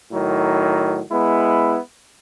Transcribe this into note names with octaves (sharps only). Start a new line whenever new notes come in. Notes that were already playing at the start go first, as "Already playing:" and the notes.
A2 D#3 F#3
G#3 B3 E4